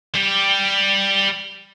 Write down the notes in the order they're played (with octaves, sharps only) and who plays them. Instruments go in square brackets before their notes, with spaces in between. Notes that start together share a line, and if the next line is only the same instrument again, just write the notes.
[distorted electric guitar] G3 G4